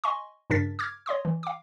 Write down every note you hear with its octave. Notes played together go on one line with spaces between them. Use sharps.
D#5 G#5 C6 C#6
G2 C#3 D4 A#4 A6 B6
D6 F6 G#6
C#5 D#5 C6 D#6
E3
F5 D6